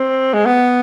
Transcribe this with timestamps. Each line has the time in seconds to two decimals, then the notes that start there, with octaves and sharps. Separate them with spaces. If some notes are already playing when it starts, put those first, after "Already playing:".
Already playing: C4
0.34 G#3
0.46 B3